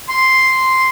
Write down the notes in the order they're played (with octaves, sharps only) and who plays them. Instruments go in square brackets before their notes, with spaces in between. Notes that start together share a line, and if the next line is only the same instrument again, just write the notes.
[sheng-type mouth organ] C6